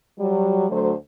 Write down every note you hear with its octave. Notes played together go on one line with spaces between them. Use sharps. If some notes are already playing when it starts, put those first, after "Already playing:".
F#3 G3
D2 F#3 A3 C5